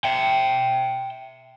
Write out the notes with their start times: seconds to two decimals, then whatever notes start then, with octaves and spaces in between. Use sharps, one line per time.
0.04 E5 G5